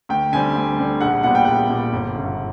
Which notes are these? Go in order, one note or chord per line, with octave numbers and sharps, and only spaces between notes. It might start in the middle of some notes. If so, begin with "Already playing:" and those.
D2 G5
D3 G3 C4 G#5
D2
D3 G3 C4
A#1 F#5
A#2 G3 B3 F#5
G5
A#1 F#5
A#2 G3 B3
G1
F#2 C#3